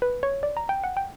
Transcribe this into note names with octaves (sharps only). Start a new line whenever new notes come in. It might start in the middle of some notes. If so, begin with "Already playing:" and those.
B4
C#5
D5
A#5
G5
F#5
G5